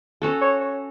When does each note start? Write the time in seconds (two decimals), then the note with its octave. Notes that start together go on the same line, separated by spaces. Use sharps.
0.22 C#4 F#4 A4
0.42 C#5
0.61 C#5